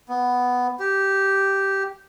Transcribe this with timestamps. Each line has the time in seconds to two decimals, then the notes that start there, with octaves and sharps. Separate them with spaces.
0.09 B3
0.79 G4